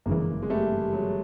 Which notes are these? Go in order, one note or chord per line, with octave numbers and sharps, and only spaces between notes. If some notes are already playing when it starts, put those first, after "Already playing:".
G1 F#2 C#3 E3 G#3 A#3
G#3
G3 A3
F#3 G#3